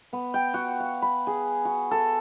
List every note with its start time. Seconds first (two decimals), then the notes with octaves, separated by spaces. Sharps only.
0.13 B3
0.34 G5
0.54 F#4
0.80 F5
1.02 B5
1.27 G#4
1.65 F#4
1.91 A4